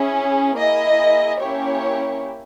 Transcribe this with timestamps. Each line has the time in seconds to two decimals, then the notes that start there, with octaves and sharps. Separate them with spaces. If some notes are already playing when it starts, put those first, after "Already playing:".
Already playing: C#4 E4 G#4
0.57 A#3 E4 G#4 D#5
1.41 A#3 C#4 E4 G4 C#5